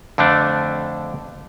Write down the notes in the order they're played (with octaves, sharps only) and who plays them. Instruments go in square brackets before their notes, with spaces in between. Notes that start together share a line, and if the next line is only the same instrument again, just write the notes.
[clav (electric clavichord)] F2 D3 A3 D4